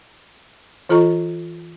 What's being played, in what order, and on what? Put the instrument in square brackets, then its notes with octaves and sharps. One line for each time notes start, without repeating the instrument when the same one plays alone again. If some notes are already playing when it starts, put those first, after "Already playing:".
[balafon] E3 F4 A4 D#5 A#5 C#6